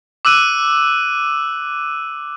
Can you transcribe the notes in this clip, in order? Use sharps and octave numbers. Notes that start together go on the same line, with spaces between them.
D6 E6 F#6 D#7